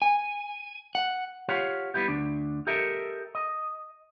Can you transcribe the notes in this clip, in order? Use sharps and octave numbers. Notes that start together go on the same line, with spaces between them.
G#5
F#5
F4 G4 C#5 F5 F#5
G3 B3 E4 G4
D2 D4
G4 A4 A#4 D#5 E5
D#5